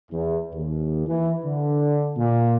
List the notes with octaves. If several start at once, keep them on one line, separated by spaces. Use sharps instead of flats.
E2
D#2
E3
D3
A#2